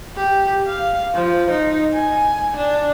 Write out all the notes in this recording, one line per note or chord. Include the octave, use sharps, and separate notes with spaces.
G4
F5
F3
D#4
G#5
D4